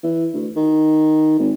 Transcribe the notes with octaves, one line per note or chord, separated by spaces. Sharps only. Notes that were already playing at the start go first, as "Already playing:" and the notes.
E3
D2
D#3
G#1